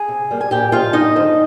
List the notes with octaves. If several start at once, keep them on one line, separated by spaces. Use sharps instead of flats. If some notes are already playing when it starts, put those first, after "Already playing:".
Already playing: G#4 G#5
C3
G3 A#3
G#5
A#2 G4 G5
F3 G#3 F4 F5
G2 D#4 D#5
D3 F3